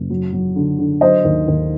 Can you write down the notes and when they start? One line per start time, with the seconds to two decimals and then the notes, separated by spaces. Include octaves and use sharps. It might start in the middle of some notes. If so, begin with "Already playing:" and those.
Already playing: F#1
0.10 F#3
0.33 F#3
0.56 D3
0.79 D3
1.01 F#3 C5 D#5
1.24 D#2
1.48 D#2